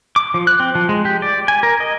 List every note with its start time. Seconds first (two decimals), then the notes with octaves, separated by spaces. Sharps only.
0.16 D6
0.34 F3
0.47 F#6
0.60 C4
0.75 F3
0.89 G#3
1.05 G4
1.22 D5
1.48 G#5
1.63 A#4
1.80 D#5